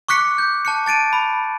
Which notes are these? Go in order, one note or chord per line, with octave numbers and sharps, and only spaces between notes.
C#6 D6 F#6 B6 C#7
G6
A5 F#6 C#7
A5 A6 D7 D#7
B5